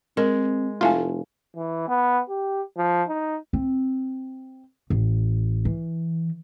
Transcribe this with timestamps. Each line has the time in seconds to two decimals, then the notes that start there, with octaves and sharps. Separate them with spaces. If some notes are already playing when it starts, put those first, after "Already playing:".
0.17 G#3 C4 A#4
0.81 F1 A3 E4 F4 F5 G#5
1.56 E3
1.88 B3
2.29 G4
2.77 F3
3.09 D#4
3.53 C4
4.90 A1
5.65 E3